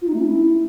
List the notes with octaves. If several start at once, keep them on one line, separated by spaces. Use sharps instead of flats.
F4
D#4
A3
C#4
E4